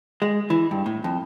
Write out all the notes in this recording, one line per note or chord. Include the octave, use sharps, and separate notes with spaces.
G#3
E3
G2
A2
F2